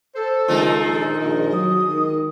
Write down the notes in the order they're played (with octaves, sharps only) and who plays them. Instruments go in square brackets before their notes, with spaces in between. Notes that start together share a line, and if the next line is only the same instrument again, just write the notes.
[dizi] A4 [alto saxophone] C5
[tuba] C#2 [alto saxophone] D#3 [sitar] G#3 A#3 F4
[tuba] A#1
A#1
[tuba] F#3 [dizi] D#6
[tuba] D#3